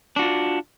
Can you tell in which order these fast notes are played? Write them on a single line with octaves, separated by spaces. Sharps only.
D4 F#4 F4